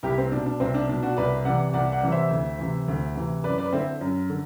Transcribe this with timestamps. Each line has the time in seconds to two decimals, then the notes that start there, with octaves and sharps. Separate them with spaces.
0.03 C2 E4 G4
0.18 C4
0.32 B2 D4
0.46 D4
0.60 C2 C4
0.74 D4
0.89 B2 D4
1.03 D4 F#4
1.17 C2 B4 D5
1.45 C3 E3 D5 F#5
1.73 C2 D5 F#5
1.92 D5 F#5
2.03 C3 E3
2.12 C5 E5
2.31 D2
2.59 C3 E3
2.88 D2
3.16 C3 E3
3.44 F#2 B4 D5
3.58 B4 D5
3.73 D3 C4 E4
4.01 F#2
4.30 D3